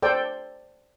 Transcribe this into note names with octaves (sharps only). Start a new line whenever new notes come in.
A4 C5 D5 G5